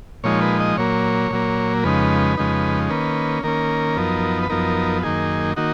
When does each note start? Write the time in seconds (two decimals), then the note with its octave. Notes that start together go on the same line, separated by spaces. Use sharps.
0.24 A#2 F3 G#3 D#4 C#5
0.42 B4
0.60 D#5
0.77 A#2 F#3 A#3 C#5
1.31 A#2 F#3 A#3
1.84 F2 C#3 G#3 D#4 B4
2.37 F2 C#3 G#3 D#4
2.90 D#3 A#3 C#4 B4
3.43 D#3 A#3 C#4 A#4
3.97 F#2 F3 B3 D#4
4.43 B4
4.50 F#2 F3 B3 D#4 A#4
5.03 F#2 D#3 A#3 D#4 G#4
5.56 D#3 A#3 D#4 F#4